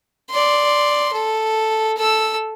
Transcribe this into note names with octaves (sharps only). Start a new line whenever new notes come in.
D5 C6
A4
A4 E6